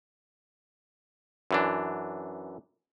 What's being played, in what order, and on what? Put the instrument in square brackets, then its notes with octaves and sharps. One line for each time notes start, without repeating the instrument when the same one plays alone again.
[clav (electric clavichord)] F#2 E3 D4